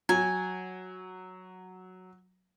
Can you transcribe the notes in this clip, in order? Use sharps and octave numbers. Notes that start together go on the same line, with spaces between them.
F#3 G#5